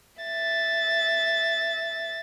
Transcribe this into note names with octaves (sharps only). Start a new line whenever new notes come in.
E5 A6